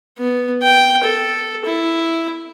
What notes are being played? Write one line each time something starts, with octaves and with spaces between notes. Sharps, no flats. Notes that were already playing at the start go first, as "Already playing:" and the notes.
B3
G5
A4
E4